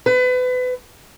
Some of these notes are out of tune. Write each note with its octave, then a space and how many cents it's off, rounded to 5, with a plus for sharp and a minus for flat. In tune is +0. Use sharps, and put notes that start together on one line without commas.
B4 +30